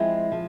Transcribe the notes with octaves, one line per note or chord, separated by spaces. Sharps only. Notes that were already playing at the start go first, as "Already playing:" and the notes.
Already playing: F3 G#3 C4 E4
F3